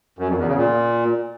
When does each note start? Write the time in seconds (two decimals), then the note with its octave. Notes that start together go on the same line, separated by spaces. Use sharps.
0.19 F#2
0.28 F2
0.38 E2
0.47 C#3
0.57 A#2